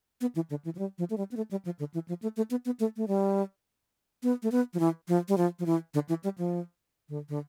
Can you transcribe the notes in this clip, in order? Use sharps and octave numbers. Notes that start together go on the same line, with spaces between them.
B3
E3
D3
E3
F3
G3
F3
A3
G3
B3
A3
G3
F3
D3
E3
F3
A3
A3
B3
B3
A3
A3
G3
B3
A3
B3
F3
E3
F3
G3
F3
F3
E3
D3
E3
G3
F3
D3
D3